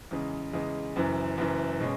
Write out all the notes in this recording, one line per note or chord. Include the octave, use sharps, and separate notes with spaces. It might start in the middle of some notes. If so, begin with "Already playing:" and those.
E2 C#3 G#3
E2 C#3 G#3
F#1 F#2 E3
F#1 F#2 E3
B2 G#3 C#4